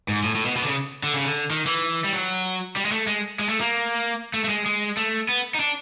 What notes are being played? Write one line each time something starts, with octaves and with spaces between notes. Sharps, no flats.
G#2
A2
A2
B2
B2
D3
C#3
D3
C#3
D3
D#3
E3
G3
F#3
G3
G#3
A3
G#3
G#3
A3
A#3
A3
A3
G#3
G#3
A3
B3
D#4
D4